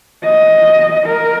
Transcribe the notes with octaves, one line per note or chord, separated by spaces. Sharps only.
D#5
A#4